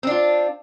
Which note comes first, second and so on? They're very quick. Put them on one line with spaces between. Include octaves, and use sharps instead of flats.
C4 D4 F4